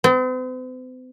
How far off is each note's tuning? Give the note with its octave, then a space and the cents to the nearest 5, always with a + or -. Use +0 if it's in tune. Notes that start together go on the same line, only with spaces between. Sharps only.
C4 -45